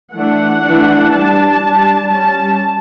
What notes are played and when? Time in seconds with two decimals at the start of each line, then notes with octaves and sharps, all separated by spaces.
0.13 E3 A3 D4 F#5
0.61 E3 A3 D4
1.12 G3 D4 A5
1.61 G3 D4
2.10 G3 C#4 A5